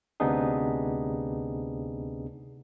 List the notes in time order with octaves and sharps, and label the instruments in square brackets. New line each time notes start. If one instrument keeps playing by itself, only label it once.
[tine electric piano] D2 C3 B3 D4 D#4 G#4